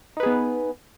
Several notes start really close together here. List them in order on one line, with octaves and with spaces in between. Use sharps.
D#4 B4 G#4 B3